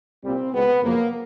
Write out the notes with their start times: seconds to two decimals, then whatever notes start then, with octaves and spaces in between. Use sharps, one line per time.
0.23 C2 A#2 G3 C4
0.53 C#2 B2 G#3 B3
0.82 F#2 C#3 F3 A#3